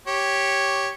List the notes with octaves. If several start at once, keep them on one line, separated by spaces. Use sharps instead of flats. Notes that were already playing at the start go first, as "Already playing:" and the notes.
G4 C#5